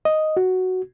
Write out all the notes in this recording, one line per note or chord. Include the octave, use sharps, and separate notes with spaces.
D#5
F#4